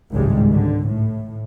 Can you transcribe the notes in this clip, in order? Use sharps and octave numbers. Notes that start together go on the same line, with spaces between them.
G#1 C#2 A2 G3 G#3
D3
A2